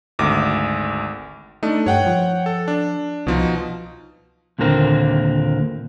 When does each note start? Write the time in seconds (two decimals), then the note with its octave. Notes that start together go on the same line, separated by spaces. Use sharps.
0.19 G#1 D2 D6
1.63 A3 D4 D#4
1.86 G2 C#5 F#5 G5
2.06 F3
2.46 A4
2.68 D4
3.27 C2 B2 F3 D#4
4.59 D#2 A#2 D3 A#3 C4